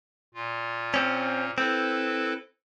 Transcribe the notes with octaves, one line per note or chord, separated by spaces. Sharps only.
A#2 F4
C4 C#4
C4 E4 A4 B4